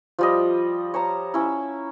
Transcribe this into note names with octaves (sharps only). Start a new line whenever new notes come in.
F3 G3 D#5
C#5 A5 A#5
C#4 E4